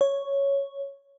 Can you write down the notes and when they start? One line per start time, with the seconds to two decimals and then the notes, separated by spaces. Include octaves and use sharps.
0.01 C#5